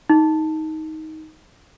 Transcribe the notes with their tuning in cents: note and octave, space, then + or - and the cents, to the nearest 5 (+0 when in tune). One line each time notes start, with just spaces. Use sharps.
D#4 +15